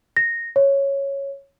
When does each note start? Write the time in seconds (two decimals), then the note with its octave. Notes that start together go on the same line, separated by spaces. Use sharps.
0.17 A#6
0.56 C#5